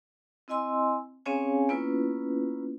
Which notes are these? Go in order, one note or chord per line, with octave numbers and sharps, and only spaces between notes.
C4 E4 D#5 G#5 C6 E6
C4 C#4 G#4 C#5 F5 G#5
A#3 B3 C#4 E4 F4 B4